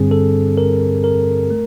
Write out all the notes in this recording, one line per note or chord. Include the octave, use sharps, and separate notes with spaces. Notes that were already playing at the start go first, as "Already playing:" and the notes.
Already playing: G2 D3 G3 C4 G#4
A4
A#4
A#4
A3